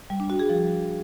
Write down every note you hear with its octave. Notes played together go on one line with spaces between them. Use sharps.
G3
D4
F#4
G#4
F3